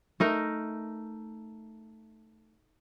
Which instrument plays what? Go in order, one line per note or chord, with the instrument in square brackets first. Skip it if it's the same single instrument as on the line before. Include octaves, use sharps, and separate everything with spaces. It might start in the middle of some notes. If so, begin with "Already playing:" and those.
[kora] A3 D#4 A#4